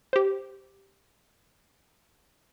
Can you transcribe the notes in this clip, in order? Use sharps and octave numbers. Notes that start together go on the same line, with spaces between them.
G4 C5